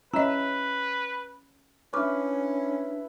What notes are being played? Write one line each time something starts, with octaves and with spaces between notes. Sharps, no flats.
C#4 E4 B4 D#5 A#5 E6
C#4 D4 E4 B4 C#6 D6 F6